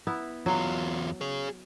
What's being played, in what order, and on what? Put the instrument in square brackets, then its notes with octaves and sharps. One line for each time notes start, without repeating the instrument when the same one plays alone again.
[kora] B3 E4
[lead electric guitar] E2 F4 [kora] F#3
[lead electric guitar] G#4 C#5